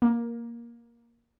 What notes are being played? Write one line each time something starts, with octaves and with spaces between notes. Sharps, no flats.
A#3